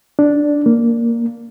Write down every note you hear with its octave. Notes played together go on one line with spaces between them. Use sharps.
D4
A#3